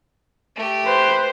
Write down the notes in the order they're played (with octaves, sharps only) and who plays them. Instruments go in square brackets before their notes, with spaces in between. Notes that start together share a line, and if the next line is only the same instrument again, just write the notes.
[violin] A3 G4
[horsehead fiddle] B4 [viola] C5